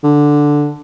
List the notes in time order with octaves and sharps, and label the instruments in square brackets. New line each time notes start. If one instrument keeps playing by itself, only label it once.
[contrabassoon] D3